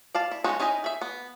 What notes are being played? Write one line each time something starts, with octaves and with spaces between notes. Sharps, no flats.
D5 F5 A5
E4
F3 G#3 C#4 D#4 F#4
C#4 D#4 E4 D#5 G#5
G#4 E5
B3